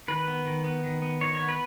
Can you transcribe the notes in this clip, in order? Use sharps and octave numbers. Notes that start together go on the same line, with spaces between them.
D#3 B4
B3
D#3
B3
D#3
B3
D#3 C#5
B3 C#5
B4